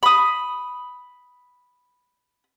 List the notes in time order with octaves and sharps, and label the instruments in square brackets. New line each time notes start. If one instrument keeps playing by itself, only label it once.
[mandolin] B5 D#6